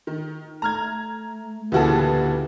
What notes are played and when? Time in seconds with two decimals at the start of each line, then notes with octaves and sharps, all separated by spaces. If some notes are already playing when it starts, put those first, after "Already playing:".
0.07 D#3
0.62 A3 A#5 F6 G#6
1.72 D2 A#2 C#3 E3 F#4 G4 A4 B4